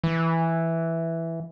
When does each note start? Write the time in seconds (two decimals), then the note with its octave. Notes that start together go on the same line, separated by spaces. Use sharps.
0.04 E3